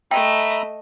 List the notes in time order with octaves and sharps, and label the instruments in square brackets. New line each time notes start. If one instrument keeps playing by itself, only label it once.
[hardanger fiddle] A3 D#5 [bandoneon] E5 A#5 B5 [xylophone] G5